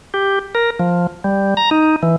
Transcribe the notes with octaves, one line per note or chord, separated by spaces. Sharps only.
G4
A#4
F3
G3
A#5
D#4
E3